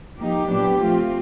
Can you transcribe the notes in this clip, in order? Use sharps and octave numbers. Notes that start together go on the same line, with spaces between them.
F3 A#3 D#4 G4
A#2 F#3 B3 D4
F3 A3 C4 F4